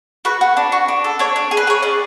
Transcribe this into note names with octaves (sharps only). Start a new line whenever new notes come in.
F#4 B4
F#4
D4
F#4
D4
A4
D4 C#5
D4
G#4
B4
G#4 C#5
C#4 D5